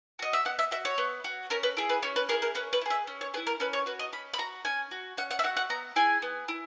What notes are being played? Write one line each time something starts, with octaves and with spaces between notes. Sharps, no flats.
F#4 D#5
E5
B3 F#5
E5
F#4 E5
C#5
B3
F#4
C#4 A#4
B4
E4 G#4
B4
C#4 C#5
B4
E4 G#4 A#4
A#4
C#4 B4
B4
E4
G#4 E5
C#4
C#5
G#4 B4
E4
A#4
C#4 B4
C#5
F#4 B4
D#5
C#4 B5
B5
F#4 A#5
C#4 G#5
F#4
C#4 F#5
F#5
E5
F#4 F#5
F#5
B3 A#5
E4 G#4 G#5
B3
E4